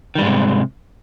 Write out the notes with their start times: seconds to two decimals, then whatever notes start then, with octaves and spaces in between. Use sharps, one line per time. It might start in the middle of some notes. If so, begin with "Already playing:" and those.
0.15 D#3
0.18 G3
0.21 G#2
0.25 G#3
0.28 C3